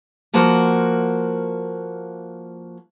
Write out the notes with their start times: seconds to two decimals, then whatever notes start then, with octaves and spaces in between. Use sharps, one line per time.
0.34 F3 A#3 F#4 C5